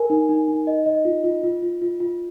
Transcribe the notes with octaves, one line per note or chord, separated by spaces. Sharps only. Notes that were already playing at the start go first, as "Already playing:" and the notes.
Already playing: A#4 G#5
D#4
D#4
D#4
D#5
D#5
F4
F4
F4
F4
F4
F4